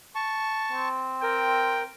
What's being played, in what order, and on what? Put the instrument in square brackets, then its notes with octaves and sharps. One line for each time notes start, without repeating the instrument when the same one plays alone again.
[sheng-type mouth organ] A5 C#6
[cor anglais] C4
[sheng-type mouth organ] A#4 [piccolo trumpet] G5